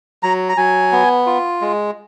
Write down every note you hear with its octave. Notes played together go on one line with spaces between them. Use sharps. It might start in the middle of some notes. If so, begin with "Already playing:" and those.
F#3 A#5
A#5
F#3 G#5
B3
F4
G#3